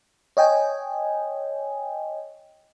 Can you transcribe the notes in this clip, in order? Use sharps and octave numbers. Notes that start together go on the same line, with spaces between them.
C#5 D#5 G5 G#5